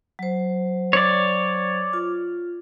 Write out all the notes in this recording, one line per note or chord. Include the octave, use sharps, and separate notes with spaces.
F#3 C5
C#5 D5
F4